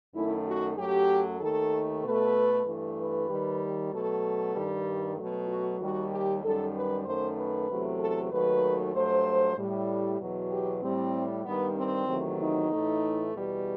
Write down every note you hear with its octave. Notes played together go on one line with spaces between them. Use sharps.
F#2 D#3 A3 E4
F#4
F#2 F#3 A3 G4
D#2 D#3 A3 A4
B2 A3 B4
G2 E3 A3
B4
D#2 D#3 G3
B2 F#3 A3 A4
G2 D#3 G3
B2 F#3 A3
F#4
D#2 D#3 G3 F#4
G4
F#2 D#3 G3 A4
B4
F#2 D#3 A3 C5
B4
E2 C3 F#3 A3
A4
D#2 D#3 F#3 A3 B4
G2 F#3 A3 C5
A2 G3
E2 B2 F#3
G4
A2 G3 C4
G2 D#3 G3 B3
C4
E2 C3 D#3 F#3 A3
D#4
A2 E3 A3
E2 B2 G3